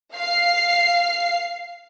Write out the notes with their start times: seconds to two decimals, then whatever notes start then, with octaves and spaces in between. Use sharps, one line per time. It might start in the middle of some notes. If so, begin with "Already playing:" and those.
0.14 F5 C7